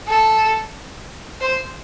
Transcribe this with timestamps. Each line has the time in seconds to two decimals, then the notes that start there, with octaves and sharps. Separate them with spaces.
0.08 A4
1.41 C5